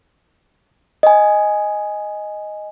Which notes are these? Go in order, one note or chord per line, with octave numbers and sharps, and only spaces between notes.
D#5 G#5